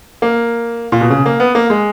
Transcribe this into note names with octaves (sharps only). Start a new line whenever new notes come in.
A#3
A#2
B2
C#3
A#3
B3
A#3
G#3